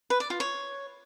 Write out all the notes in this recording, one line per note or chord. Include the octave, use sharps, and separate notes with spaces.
B4
D5
F4
C#5